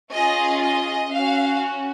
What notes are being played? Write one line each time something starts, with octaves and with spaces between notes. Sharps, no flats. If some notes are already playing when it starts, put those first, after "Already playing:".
C#4 F4 G#4 D#5
D#5
C#4 F#4 F5